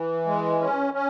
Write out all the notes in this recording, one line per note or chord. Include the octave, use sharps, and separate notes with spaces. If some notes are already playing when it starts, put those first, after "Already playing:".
Already playing: E3
G#3
C#4
C#4